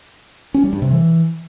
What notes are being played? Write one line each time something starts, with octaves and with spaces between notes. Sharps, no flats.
C#4
G3
G2
C3
E3